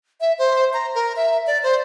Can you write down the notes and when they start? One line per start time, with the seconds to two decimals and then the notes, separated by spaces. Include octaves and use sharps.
0.21 E5
0.38 C5
0.73 A#5
0.95 A#4
1.16 E5
1.47 D5
1.63 C5